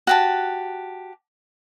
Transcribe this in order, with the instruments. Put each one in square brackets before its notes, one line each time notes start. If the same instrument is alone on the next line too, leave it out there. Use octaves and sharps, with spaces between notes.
[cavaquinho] F#4 G4 A5